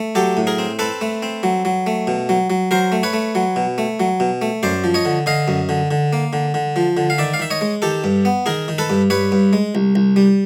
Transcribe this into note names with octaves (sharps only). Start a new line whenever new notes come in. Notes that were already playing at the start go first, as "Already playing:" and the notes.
Already playing: A3
F#3 G4 A4
A2
G#4 A#4
C4
C4 A4 B4
A3
C4
F#3
F#3
A3
B2
F#3
F#3
F#3 A#4 C5
A3
B4 C#5
A3
F#3
B2
A3
F#3
B2
A3
F#2 C5 D5
F3
C#5 D#5
D3
D3 D#5 F5
F#2
D3
D3
A#3
D3
D3
F3
D3
F5
D#3 D5 E5
F5
D#3 E5
C#5 D#5
G#3
D#3 G4 A4
G2
B3
D#3 G#4 A#4
D#3
A4 B4
G2
G2 B4 C#5
G2
G#3
C2
C2
G3